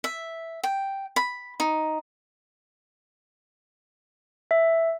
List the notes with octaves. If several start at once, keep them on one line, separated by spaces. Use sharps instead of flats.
E5
G5
B5
D#4
E5